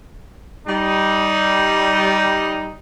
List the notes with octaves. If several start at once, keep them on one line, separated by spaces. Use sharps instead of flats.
G3 D#4